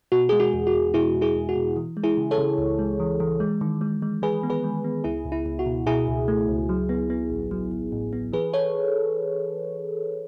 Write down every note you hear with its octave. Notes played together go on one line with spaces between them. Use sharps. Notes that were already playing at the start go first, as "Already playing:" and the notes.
B2 F#4
G#3 G#4
F#4
E2
F#4
E2
B2 E4 G#4
E2
E4 G#4
E2
F#4
B2
E3
G#3
E4 G#4
C#3
A4 C#5
C#3
C#2
G#3
E3
E3
G#3
D#3
G#3
G#3
G#3 G#4 B4
B3
G#4 B4
G#3
B3
C#2 E4 G#4
C#2
E4
C#2
F#4
B2
B2 E4 G#4
C#2
A3
C#2
F#3
B3
B3
A1
F#3
A1
A2
B3
E3 G#4 B4
A4 C#5